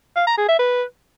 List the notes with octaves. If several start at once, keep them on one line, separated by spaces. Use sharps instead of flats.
F5
A#5
G#4
E5
B4